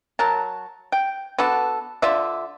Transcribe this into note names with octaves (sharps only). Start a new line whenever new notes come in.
F#3 A#4 A5
G5
B3 D4 F#4 A4
D3 F4 D5 E5